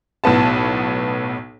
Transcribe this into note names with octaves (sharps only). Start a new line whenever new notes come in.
B1 A2 B3 A5